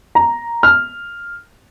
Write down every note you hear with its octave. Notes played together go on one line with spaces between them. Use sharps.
A#5
F6